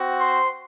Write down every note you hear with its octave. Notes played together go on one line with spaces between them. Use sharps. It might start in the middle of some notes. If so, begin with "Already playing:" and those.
Already playing: C4 F#4
C5 C6